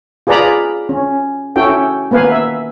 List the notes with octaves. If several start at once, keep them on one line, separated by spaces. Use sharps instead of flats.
F4 G#4 B4 D5 A#5 B5
C#4
C#4 E4 F#4 A4 G5
A#3 B3 B4 F5 G#5
E5